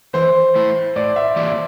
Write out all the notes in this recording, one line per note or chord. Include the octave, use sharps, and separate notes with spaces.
E3 C5
A3 E4
A2 D5
E5
E3 A#3 E4 G4 D5